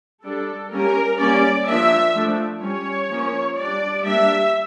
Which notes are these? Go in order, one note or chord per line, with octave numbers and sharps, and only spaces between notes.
G3 D4 A4
G3 A#3 C#4 A#4
G3 A#3 C#4 D5
F3 A#3 D4 E5
F3 A3 D4
G3 C#4 C#5
F3 A#3 C#4
G3 D4 D5
G3 A#3 D4 E5